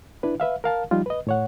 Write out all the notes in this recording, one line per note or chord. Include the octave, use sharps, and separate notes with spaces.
D4 E4 B4
B4 E5 F5
A#4 F5 A5
F3 G3 D#4 F4
B4 D#5
A2 C#5 F#5